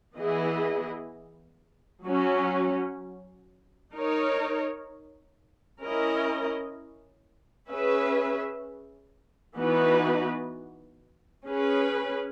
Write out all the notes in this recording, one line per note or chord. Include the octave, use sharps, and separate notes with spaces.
E3 B3 E4 G#4 D#5
F#3 C#4 F#4
D#4 A#4 C#5
C#4 E4 A#4 D#5
C#4 G#4 B4 E5
E3 B3 D#4 F#4 B4
C#4 G#4 B4